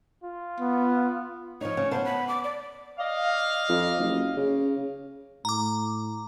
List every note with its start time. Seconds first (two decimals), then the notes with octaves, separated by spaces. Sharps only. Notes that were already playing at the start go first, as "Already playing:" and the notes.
0.24 F4
0.60 B3
1.61 F3 D#4 C#5
1.77 C#3
1.91 B3 C5 A5
2.05 B5
2.28 D6
2.44 D5
2.99 D5 D#5 F5
3.69 F2
3.99 F#1
4.37 C#3
5.45 A2 A#5 D6